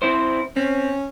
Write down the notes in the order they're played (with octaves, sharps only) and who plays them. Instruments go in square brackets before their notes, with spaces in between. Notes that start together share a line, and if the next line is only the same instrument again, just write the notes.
[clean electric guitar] C4 E4 C5
[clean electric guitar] C4 [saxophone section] C#4